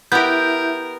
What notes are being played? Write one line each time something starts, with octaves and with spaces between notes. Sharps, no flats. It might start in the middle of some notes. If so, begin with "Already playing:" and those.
B3 E4 G4 A#4 E5 G6